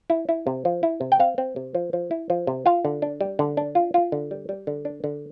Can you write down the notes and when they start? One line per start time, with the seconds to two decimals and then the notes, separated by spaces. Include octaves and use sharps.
0.10 E4
0.29 E4
0.47 C3
0.65 F3
0.83 E4
1.01 C3
1.12 G5
1.19 C4 F5
1.38 C4
1.56 C3
1.75 F3
1.93 F3
2.11 E4
2.30 F3
2.47 C3
2.66 F4 F5
2.85 D3
3.02 D4
3.21 G3
3.39 D3
3.57 D4
3.75 F4
3.94 F4
4.12 D3
4.31 G3
4.49 G3
4.67 D3
4.85 D4
5.04 D3